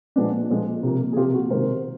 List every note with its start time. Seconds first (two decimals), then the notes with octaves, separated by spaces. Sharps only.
0.16 A#2 F3 G#3 B3 D4
0.50 A#2 F3 G#3 B3 D4
0.83 C3 F3 A#3
1.13 G#4
1.17 C3 F3 A#3 F4 G4
1.34 F#4
1.50 C3 D#3 G#3 A#4 C5